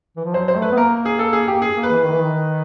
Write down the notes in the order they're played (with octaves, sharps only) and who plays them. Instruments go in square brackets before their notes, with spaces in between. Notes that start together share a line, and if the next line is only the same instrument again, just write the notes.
[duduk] E3
F3
[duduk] F#3 [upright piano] C5
[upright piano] C5
[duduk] A3
[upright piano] B4
[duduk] B3
[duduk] A#3 [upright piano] A#4
[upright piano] G#4
A4
G#4
G4
G#4
[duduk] A#3
[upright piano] B4
[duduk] E3
D#3
E3
D#3